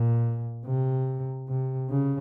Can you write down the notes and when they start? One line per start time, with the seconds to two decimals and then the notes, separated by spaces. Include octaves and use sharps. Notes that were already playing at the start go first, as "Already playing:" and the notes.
Already playing: A#2
0.66 C3
1.48 C3
1.90 C#3